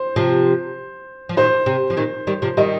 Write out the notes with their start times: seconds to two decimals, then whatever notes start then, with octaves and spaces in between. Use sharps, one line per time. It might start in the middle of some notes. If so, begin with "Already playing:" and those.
Already playing: C5
0.16 C3 F3
1.29 F3
1.37 A#2 D#3 C5
1.66 C3
1.90 F3
1.97 A#2 D#3
2.27 D#3 G3
2.42 C3 F3
2.57 D#3 G3 D#5